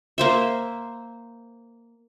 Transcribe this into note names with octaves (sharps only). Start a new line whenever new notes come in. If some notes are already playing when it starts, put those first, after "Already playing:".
A#3 C5 E5